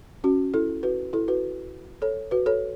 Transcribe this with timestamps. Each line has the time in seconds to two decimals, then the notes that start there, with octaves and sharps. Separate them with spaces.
0.24 C#4 F#4
0.54 E4 A4
0.83 F#4 B4
1.13 E4 A4
1.28 F#4 B4
2.02 A4 C#5
2.31 F#4 B4
2.46 A4 C#5